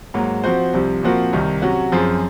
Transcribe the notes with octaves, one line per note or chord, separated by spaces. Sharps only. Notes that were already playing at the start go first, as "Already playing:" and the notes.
G#2 F#3 A#3
F3 C4 F#4 C5
C2 C3 F3
A#2 F3 C4 F#4 A#4
C2 C3 D#3
C3 F#3 C#4 F#4
F#2 F3 C4 F4 G#4